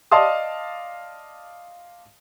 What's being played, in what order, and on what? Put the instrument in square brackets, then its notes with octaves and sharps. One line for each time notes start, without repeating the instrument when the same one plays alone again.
[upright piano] D5 D#5 F5 A5 C6 D#6